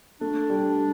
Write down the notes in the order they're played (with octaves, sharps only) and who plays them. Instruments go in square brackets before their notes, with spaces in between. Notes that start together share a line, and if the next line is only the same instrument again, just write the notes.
[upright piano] A3 [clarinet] D4
[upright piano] G3